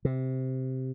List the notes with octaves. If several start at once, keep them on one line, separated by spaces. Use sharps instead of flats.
C3